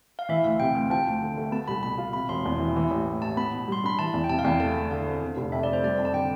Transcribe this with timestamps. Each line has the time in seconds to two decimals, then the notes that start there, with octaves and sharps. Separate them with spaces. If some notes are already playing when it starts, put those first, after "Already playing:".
0.19 F5
0.29 E3 E5
0.44 D2 F5
0.60 C3 G5
0.75 D2
0.90 F3 G5
1.07 D2
1.22 D3
1.37 A3
1.52 B3 A5
1.68 C2 B5
1.83 B2 B5
1.98 F4
2.13 C3 B5
2.29 E1 C6
2.45 E2
2.60 E3
2.76 E3
2.90 A1
3.06 A2
3.22 A1 A5
3.37 B3 B5
3.53 B2
3.68 G3 C6
3.84 D4 B5
3.99 E3 A5
4.14 E2
4.24 G5
4.29 C3 A5
4.39 F5
4.44 E2 G5
4.60 A3 A5
4.76 D2
4.91 D3 F5
5.06 C4
5.22 D3
5.37 F1
5.52 F2 E5
5.63 A3 D5
5.73 C5
5.83 G3 D5
5.98 F2
6.05 A5
6.14 D3 G5